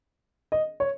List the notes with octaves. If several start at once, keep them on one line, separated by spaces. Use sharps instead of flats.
D#5
C#5